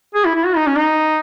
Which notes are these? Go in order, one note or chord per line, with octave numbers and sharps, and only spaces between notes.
G#4
E4
E4
F#4
D#4
C#4
D#4